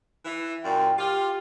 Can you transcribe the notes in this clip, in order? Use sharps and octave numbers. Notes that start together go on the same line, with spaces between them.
E3
F#2 A#2 G5
F4 G4